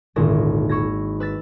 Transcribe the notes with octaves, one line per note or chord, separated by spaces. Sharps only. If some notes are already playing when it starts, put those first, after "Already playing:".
D#1 G#1 A#2 D3 E4 A#6
B5 C#6 E6 G#6 A#6
B4 E6 A6 B6